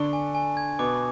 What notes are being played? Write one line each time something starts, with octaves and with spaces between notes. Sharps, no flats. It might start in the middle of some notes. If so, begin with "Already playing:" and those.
Already playing: D3 D4 C#6
G#5
G#5
G#6
B2 B3 D6